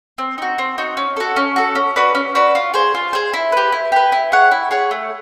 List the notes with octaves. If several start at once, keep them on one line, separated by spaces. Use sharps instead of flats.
C4
D#4 F#4
C4
D#4 F#4
C#4
F#4 A4
C#4
F#4 A4
C#4
F#4 B4 D5
C#4
F#4 B4 D5
F4
G#4 C5
F4
G#4 C5
E4
G4 B4
E4
G4 B4
E4
G#4 C#5 F#5
E4
G#4 C#5 F#5
A3